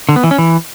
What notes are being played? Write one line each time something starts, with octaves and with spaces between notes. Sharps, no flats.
D3
B3
E3
C#4
E3